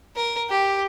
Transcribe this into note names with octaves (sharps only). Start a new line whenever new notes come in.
A#4
G4